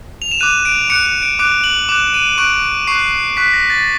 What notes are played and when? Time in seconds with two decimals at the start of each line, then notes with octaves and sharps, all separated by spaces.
0.22 F7
0.31 E7
0.40 D6 F#6 D#7
0.65 D7
0.90 D6 F#6 C#7
1.06 C#7
1.22 D7
1.39 D6 F#6 D7
1.64 F#7
1.89 D6 F#6 E7
2.14 D#7
2.38 C#6 F#6 D7
2.87 C#6 F#6 C7
3.37 C#6 F#6 B6
3.53 A#6
3.70 A6